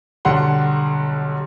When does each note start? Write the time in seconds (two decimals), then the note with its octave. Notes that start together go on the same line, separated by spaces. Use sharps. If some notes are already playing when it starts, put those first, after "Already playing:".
0.25 B1 D3 G3 F#5 C6